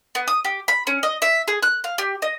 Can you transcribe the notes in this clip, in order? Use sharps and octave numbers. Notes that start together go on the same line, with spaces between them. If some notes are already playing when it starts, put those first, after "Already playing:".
B3
D#6
G4
B5
C#4
D#5
E5
G#4
F#6
F5
G4
D#5